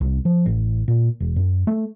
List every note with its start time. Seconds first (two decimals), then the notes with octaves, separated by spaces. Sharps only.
0.01 C2
0.25 F3
0.46 A1
0.88 A#2
1.20 E1
1.36 F#2
1.67 A3